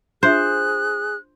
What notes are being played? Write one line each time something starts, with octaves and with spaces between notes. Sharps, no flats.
D4 F4 G#4 C5 E5 F#6